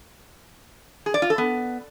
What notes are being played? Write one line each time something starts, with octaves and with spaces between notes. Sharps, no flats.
G#4
D5
F4
A4
B3